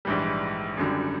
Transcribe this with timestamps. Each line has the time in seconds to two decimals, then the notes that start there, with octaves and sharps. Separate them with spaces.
0.05 A#1 G#2 E3 G3
0.77 G#1 F#2 D3 G3